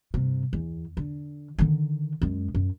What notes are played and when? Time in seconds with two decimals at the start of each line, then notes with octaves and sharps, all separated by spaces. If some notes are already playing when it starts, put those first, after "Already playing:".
0.14 G2 C3
0.53 E2
0.97 D3
1.59 D3 D#3
2.22 F#2 G#3
2.55 F#2